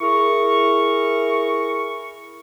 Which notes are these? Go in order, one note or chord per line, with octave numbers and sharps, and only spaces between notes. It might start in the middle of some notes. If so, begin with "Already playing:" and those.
E4 G#4 A#4 C#6